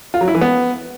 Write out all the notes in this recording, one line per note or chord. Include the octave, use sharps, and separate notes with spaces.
F4
F#3
E4
E3
B3